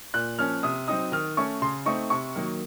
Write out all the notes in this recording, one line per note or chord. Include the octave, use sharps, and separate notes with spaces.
A#2 F#6
F3 A#3 C#4 F6
C3 D#6
F#3 C4 D#4 D#6
D#3 F6
A3 C#4 C#6
C#3 C6
A3 C4 D#4 C#6
C3 C#6
D#3 F#3 A#3